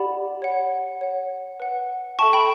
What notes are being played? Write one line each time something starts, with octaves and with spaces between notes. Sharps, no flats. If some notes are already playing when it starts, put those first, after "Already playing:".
Already playing: G4 D5 F#5 B5
C#5 F#5
C#5 F#5
B4 F#5
A4 E5 G5 A5 C#6
G5 B5